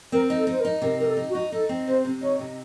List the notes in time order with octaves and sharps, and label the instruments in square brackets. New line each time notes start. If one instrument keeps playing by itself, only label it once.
[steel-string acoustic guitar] C4 [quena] A#4
[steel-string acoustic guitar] D#4
[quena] A4
[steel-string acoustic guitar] D#4 [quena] C5
[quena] A#4
[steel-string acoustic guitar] D#4
[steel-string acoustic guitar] C3 [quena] A#4
[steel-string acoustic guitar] D#4 [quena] A#4
[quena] A4
[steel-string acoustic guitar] D#4
[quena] F#4
[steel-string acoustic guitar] D#4
[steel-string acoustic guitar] D#4 [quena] A4
[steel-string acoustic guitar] C4
[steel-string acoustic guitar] C3 [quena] C5
[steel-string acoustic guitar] C3
[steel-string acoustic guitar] D#4 [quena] C#5
[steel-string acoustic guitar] C3